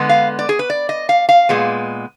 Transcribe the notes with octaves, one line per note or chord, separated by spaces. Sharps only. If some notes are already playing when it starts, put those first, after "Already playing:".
Already playing: D3 G#3 B3
F5
D5
G#4
B4
D5
D#5
F5
F5
A#2 G#3 B3